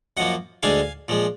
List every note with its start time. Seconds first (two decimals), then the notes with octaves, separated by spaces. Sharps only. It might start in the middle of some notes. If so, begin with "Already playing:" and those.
0.17 F#2 F3 A#3 D#5 F#5
0.63 D2 D3 G#3 D4 F5 G#5
1.08 A#2 F3 G#3